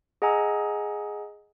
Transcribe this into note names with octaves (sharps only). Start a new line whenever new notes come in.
G#4 D#5 F#5 G#5 A#5 E6